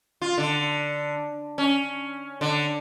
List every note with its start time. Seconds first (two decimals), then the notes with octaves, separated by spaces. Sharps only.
0.22 F4
0.38 D3
1.58 C#4
2.41 D3